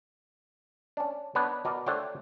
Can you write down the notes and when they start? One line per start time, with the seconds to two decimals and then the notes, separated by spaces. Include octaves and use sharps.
0.97 C#4 D4
1.35 B3 D4 D#4 B4 C#5
1.65 B2 A#4 D5 D#5
1.86 A3 D4 C5 C#5 F#5 G5